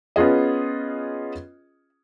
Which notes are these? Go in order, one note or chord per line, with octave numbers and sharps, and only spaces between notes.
B3 C#4 F4 G#4 D#5